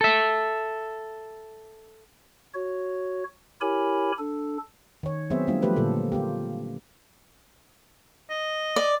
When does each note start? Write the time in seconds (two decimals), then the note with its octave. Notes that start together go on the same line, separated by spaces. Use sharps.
0.01 A4 E5
2.54 F#4 C#5
3.61 E4 G4 A#4 C#5 G#5 B5
4.18 D4 A4
5.03 D#3 C#5
5.30 F#3 B3 C4 G#4 C5 E5
5.47 G3 A3 B3 D4 F4
5.62 F3 F#3 A3 G4 B4 C5
5.76 A#2 D3 A#3 A4
6.12 A#3 F4 G4
8.30 D#5
8.76 D5